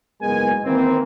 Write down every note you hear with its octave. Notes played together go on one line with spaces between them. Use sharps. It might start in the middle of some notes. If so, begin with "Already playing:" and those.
F#1 G#2 G#3 B3 A#4 G#5
D#3 E3 A#3 C4